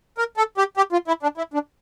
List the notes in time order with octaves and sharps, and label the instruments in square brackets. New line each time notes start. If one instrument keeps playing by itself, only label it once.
[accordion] A#4
A4
G4
G4
F4
E4
D4
E4
D4